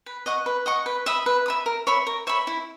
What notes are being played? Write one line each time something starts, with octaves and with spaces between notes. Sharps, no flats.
B4
D#5 F#5 C#6
B4
D#5 F#5 C#6
B4
E5 B5 D#6
B4
E5 B5 D#6
A#4
C#5 E5 B5
A#4
C#5 E5 B5
E4